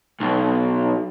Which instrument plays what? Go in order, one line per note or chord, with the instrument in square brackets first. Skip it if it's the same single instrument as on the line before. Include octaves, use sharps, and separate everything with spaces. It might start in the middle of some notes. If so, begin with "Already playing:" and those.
[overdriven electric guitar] B1